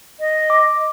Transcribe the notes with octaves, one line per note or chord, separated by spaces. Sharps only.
D#5
D6